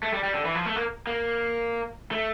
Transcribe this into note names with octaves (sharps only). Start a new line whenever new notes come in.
A3
G3
G3
D3
E3
F3
A3
A#3
A#3
A3